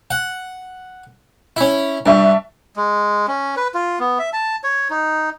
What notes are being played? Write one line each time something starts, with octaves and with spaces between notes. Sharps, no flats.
F#5
C#4 E4
G2 D4 E5 C#6
G#3
C#4
B4
F4
B3
E5
A5
C#5
D#4